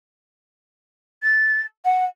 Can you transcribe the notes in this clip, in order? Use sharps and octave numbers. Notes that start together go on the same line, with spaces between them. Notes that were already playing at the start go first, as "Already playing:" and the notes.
A6
F#5